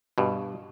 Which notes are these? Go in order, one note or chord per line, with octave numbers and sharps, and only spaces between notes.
G2 B2